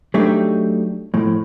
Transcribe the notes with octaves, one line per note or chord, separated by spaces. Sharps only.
F#3 A3 D4 D#4 G4 E5
A2 F3